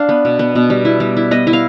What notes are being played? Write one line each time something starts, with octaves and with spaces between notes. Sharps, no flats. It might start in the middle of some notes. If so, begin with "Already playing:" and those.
Already playing: D4 F5
B3
B2
B3
B2
G3
E4
G3
E4
B3 D#5
E4
F5